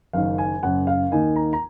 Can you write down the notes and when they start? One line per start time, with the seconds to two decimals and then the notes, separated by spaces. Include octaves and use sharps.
0.13 F#1 F#2 D#3 F5
0.38 G#5
0.63 F#1 F#2 C#3 F#5
0.87 F5
1.11 D#2 D#3 A#3 D#4 G#5
1.36 A#5
1.53 A#5